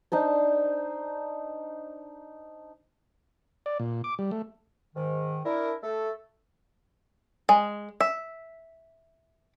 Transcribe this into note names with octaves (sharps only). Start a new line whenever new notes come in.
D4 D#4 C5 A5
D5
A#2
D6
G3
A3
G#2 D#3
D4 E4 A#4
A3 A4
G#3
E5